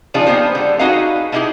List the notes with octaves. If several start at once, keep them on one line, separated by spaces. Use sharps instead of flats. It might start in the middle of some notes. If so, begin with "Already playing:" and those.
C#3 F3 D4 D#4 F4 G#4
A#3 B3 D#4 G4 C5
D3 G3
D#4 F#4 G#4 B4 D#5 F5
A3 A#3 D#4 E4 G4 G#4